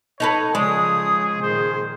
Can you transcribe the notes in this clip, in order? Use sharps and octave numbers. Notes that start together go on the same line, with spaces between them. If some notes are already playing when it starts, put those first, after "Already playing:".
D#4 A4 B4 C#5
C#3 F3 G#3 G#4 D5 D#6
A#2 D#3 G#4 C5